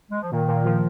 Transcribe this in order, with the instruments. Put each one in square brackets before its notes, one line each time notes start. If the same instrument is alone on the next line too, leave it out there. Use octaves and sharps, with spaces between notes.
[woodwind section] G#3
F3
[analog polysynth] A#2 [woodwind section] D#3
[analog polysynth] A#2
F3